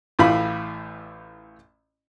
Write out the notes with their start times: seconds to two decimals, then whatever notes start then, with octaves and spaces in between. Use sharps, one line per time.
0.19 A1 A2 F4 B5